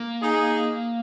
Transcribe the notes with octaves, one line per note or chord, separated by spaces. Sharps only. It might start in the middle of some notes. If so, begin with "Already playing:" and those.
Already playing: A#3
D#4 G#4